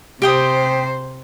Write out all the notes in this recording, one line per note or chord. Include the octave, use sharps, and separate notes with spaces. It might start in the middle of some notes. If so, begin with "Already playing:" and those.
C3 G4 C5 G5 D#6